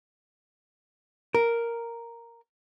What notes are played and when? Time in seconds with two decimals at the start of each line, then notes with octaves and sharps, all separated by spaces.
1.35 A#4